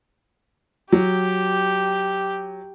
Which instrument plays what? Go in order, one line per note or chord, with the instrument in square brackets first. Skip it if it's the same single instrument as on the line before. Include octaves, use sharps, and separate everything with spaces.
[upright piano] F#3 [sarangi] G4